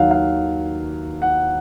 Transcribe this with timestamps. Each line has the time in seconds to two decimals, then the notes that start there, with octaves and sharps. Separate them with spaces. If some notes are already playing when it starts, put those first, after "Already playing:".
Already playing: D#2 D#3 F#3 F5 F#5
0.11 F5
1.22 F#5